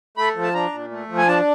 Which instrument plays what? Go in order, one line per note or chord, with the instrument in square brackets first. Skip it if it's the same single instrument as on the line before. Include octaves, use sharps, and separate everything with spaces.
[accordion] A3 B5
F3
A5
D4 A#5
A#2
A3
F3
G#5
D4 A5